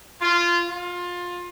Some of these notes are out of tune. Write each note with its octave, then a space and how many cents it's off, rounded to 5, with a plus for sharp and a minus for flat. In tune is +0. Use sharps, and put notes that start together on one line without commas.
F4 -15
F4 +20